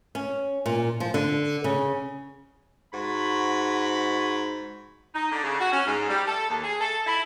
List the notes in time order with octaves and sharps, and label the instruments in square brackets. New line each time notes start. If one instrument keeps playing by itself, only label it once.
[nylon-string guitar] C#4
A#2
F3
D3
C#3
[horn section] G#2 F#4 B5
[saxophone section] D#4
D3
C#3
F#4
C#4
G#2
G3
A4
D#2
G#4
A4
E4